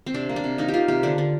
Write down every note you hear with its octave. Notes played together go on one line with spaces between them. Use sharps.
C4
C3 D4
A#3
D4
C3
A#3 D#4
G4
A#3 F4
C3 G4
D3 D4
D3